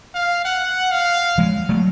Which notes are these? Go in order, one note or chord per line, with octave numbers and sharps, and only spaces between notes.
F5
F#5
F5
F3 G#3
F#3 A3